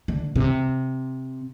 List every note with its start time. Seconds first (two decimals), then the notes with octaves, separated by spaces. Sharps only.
0.08 D3
0.36 C3